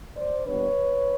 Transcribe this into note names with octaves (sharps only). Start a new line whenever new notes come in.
C5 D5
A#2 G3 B3 D4 B4 C#5